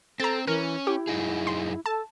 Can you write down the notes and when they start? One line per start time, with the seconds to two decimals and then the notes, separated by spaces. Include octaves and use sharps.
0.20 C4 A4 A#5 A6
0.47 E3 C#4 A#4
0.87 E4 G4
1.07 F#2 D#4 G#4
1.47 C6
1.86 A4 A5